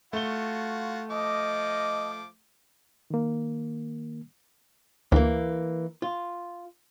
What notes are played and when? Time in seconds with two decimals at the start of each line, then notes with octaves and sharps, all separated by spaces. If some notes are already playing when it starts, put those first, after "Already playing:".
0.13 A3 F4 F#4 G7
1.10 F3 D#5 D6
3.10 D#3 A#3
5.12 D2 E3 A#3
6.02 F4